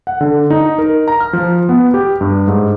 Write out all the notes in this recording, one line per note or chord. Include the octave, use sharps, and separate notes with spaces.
F#5
D3
D#4
A#4
A#5
F6
F3
B3
G4
G2
G#2